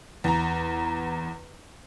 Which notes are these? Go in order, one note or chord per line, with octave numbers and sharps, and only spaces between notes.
E2 A#5